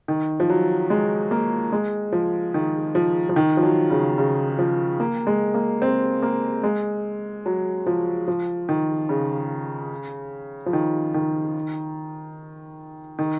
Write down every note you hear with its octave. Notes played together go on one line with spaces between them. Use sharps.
D#3
F3
F#3
G#3
A#3
G#3
F3
D#3
F3
F3
D#3
F3
F#3
C#3
C#3
F3
A#3
G#3
A#3
C4
A#3
G#3
F#3
F3
F3
D#3
C#3
F3
D#3
D#3
D#3